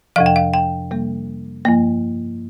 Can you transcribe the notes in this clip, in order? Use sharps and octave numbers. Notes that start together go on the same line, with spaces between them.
F2 C3 F3 F5
G5
F5
G5
C3 G3 A#3
G2 F3 A#3